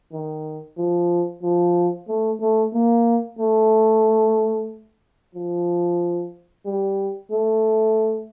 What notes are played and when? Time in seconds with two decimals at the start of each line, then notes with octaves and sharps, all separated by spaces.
0.13 D#3
0.78 F3
1.43 F3
2.09 A3
2.41 A3
2.74 A#3
3.39 A3
5.35 F3
6.66 G3
7.31 A3